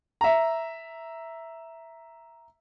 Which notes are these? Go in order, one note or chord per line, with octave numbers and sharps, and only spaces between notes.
E5 A#5